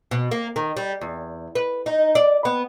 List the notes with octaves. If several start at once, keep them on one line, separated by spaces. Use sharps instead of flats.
B2
A#3
D#3
G3
E2
B4
D#4
D5
B3